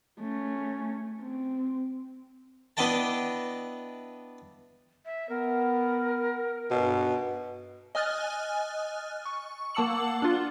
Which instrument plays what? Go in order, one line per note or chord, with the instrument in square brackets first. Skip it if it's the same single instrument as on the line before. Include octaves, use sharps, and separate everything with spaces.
[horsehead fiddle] A3 C#4
C4
[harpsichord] B3 D4 E4 D#5 G5 A5
[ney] E5
[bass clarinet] B3 [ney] A#4
[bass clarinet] G2 [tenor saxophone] B2
[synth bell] D#5 G#5 D#6 F6 F#6 A6
C#6
A#3 F#5 A5 E6 C#7 F#7
D4 F4